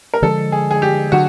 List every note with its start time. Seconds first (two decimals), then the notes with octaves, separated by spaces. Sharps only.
0.14 A#4
0.22 D3 F3 G#3 A4
0.52 G#4
0.71 G#4
0.82 G4
1.12 D3 F#3 F#4